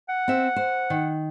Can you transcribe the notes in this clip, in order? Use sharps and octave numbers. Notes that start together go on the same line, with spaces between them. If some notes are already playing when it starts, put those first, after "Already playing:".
F#5
C4 E5
C5
D#3